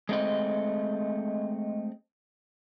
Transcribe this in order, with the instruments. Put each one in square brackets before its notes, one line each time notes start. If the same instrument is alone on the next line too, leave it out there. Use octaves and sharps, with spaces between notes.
[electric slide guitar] G#3 A3 C4 D#5